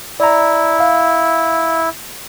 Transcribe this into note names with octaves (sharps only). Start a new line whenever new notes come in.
E4 D5 A#5
F5